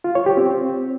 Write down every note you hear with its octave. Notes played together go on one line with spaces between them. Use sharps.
F4
C#5
G4
C4